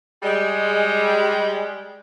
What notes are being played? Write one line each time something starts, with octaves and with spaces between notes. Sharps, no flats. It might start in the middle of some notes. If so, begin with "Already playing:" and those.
G3 G#3